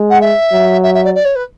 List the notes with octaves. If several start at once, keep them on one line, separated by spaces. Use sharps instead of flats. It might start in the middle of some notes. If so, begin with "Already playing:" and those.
Already playing: G#3
F#5
E5
F#3
E5
E5
D5
D5
C#5
B4